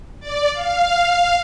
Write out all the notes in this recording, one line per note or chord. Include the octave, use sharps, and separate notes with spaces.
D5
F5